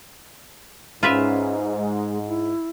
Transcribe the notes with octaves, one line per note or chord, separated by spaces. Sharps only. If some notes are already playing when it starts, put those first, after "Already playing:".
G#2 C#4 F4 B4 E5
G#3
E4